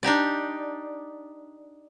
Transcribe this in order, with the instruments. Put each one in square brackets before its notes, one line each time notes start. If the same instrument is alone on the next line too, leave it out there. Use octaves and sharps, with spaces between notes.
[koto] D4 D#4 G4 D5